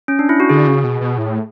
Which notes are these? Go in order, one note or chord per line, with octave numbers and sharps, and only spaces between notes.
C#4
D4
E4
F#4
D3 G#4
C#3
B2
B2
A2